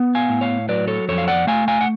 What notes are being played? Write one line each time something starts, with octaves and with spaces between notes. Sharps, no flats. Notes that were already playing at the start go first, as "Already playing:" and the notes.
Already playing: B3
F5 G#5
A2
C#5 F5
F#3 B4 D5
A4 C#5
F2 A4 C#5
F5
D5 F#5
A3 F5 G#5
F5 G#5
F#5